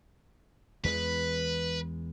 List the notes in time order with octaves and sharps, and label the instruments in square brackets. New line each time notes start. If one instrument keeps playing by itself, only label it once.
[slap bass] E2 E3 G#3 [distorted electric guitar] B4